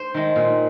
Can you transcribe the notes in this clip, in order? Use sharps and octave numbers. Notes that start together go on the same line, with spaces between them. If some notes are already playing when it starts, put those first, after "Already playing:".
Already playing: C5
D#3 G#3
A#2